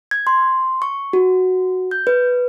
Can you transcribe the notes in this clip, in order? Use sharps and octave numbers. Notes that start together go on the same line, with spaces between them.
G#6
C6
C#6
F#4
G6
B4